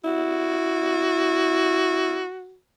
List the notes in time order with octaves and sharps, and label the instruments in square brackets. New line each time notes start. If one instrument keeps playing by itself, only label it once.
[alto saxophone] E4 [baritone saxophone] F#4